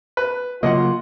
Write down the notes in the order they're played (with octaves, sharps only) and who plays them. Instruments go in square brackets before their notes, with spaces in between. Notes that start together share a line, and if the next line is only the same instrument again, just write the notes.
[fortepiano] B4
[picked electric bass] C#3 F#3 A#3 [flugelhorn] F4 [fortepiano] D#5 F#5